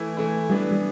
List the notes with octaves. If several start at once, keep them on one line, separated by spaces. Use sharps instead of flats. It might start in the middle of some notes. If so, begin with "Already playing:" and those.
Already playing: E3 A3 E4
E3 A3 E4
E3 G3 B3 D4
G3